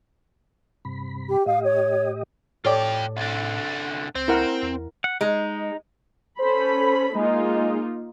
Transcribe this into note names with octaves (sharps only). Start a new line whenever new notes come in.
G2 C3 B5
G4
A2 G4 D#5 F5
C#5
A2 F4 A4 C#5 D5 G5
C2 D3
C#2 C4
E4 A#4 F#5
E2
F#5
G#3 D#4
C#4 A4 C5 B5
G#3 A#3 D#4 F4